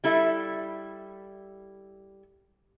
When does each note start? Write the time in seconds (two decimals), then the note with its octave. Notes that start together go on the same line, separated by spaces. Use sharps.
0.04 G3 E4 A4 E5